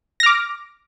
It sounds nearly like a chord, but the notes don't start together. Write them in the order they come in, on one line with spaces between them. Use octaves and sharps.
A#6 F6 D6